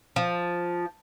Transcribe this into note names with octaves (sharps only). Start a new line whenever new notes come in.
F3